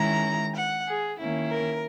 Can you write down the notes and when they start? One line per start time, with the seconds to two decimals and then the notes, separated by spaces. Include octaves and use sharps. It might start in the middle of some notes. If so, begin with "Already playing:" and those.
Already playing: D#3 G#3 C#4 E4 A#5
0.55 F#5
0.86 G#4
1.18 D#3 A#3 C#4 E4
1.50 A#4